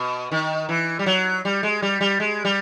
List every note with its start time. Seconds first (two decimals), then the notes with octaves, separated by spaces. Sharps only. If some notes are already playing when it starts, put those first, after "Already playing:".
Already playing: B2
0.31 D#3
0.69 E3
0.99 G3
1.06 F#3
1.45 G3
1.63 G#3
1.82 G3
2.01 G3
2.20 G#3
2.45 G3